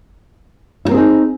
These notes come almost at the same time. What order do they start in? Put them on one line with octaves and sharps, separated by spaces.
E4 A#4 C4 G#4 D#4